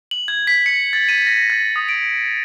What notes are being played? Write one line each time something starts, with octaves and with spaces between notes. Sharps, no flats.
F#7
G#6
B6
C#7
A6
D#7
A#6
A6
D#6
D7